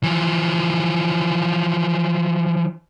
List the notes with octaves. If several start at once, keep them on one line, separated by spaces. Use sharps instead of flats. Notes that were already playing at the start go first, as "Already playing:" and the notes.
E3 F3